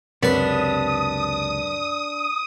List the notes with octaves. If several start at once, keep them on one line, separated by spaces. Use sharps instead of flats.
C#2 F#2 C3 D4 B4 D#6